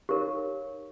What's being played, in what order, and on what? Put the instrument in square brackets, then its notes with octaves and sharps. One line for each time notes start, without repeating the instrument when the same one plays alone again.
[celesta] D#4 C#5 F5 [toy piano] G4 A#4